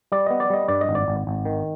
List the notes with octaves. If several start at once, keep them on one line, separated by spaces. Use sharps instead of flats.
G3 D5
B3 D#5
D5
G3 D#5
G2 D5
D#5
G#1
D5
G#1
G#1
D#3